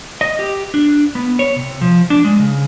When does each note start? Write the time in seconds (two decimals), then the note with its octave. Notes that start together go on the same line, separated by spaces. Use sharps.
0.21 D#5
0.39 G4
0.74 D4
1.15 B3
1.39 C#5
1.56 C3
1.81 F3
2.10 D4
2.25 G#3
2.39 C#3